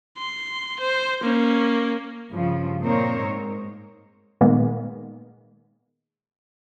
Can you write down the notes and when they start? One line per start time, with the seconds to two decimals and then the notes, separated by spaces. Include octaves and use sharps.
0.18 C6
0.80 C5
1.23 A#3 C#4
2.31 G2 C#3 F3
2.81 A#2 C4 D#4 A#4 C5 C#5
3.22 G#2
4.41 A#2 D#3 G#3 A#3 B3